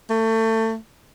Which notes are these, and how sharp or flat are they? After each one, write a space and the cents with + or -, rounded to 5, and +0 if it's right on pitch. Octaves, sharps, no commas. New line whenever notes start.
A3 +25